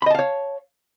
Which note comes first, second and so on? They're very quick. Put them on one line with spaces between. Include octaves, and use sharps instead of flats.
B5 D#5 A5 F5 C#5